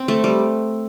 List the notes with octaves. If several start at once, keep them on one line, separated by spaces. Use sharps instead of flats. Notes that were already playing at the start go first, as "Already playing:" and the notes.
Already playing: C4
A3
G3